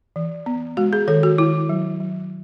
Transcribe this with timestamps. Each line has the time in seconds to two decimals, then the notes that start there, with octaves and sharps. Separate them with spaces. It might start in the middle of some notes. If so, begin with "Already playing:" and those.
0.16 E3
0.46 B3
0.77 G#3 F#4
0.93 G#4
1.08 D#3 A4
1.23 F#4
1.38 D#3 E4
1.69 F#3
2.00 F#3